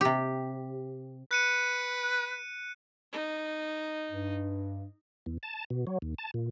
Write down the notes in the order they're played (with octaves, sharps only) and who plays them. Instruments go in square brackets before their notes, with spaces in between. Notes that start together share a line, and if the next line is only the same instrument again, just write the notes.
[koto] C3 G4
[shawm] B4 [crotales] F#6 C#7 D#7
[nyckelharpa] D#4
[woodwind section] G2
[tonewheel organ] E2
A5
B2
F#3
D#2
A5
A#2